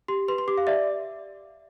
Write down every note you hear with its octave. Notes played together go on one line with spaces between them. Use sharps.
G4 C6
B4 C6
C6
G4 D6
F5
D5 E5